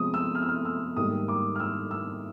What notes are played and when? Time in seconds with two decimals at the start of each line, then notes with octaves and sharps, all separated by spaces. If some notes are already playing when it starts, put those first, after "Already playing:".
Already playing: C3 F3 G#3 B3 D#6
0.14 E6
0.35 F6
0.42 E6
0.49 F6
0.65 E6
0.97 G#2 D#3 G3 A#3 D#6
1.28 D6
1.55 F6
1.60 E6
1.91 E6